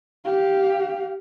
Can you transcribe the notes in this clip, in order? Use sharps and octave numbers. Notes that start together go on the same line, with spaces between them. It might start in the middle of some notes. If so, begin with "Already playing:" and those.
G4 F5